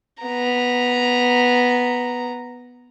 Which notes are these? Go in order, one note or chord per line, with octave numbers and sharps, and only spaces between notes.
B3 A#5